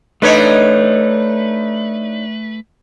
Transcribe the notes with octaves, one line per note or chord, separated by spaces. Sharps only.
A3 D4 D#4 B4 C#5